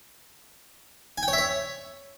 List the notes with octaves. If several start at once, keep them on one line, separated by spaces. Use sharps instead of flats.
G#5
G5
C#5
E5
C#5